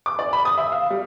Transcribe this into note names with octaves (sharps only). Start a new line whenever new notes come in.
D6
D5
B5
D#6
E5
F5
G3